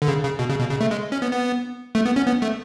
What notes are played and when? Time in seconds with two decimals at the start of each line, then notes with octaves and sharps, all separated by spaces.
0.02 D3
0.08 C#3
0.23 C#3
0.39 B2
0.50 C#3
0.59 B2
0.70 C#3
0.81 A3
0.91 G#3
1.12 C#4
1.22 B3
1.33 B3
1.95 A3
2.06 B3
2.16 C#4
2.27 B3
2.42 A3